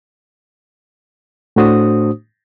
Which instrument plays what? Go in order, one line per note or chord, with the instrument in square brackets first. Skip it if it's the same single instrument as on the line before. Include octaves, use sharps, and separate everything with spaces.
[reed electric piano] A2 A3 D4 F#4 C5 D#6